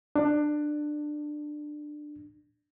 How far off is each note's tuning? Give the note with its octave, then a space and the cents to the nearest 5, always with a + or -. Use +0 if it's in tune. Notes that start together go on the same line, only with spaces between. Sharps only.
D4 +20